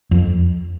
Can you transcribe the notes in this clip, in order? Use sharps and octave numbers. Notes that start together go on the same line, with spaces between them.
F2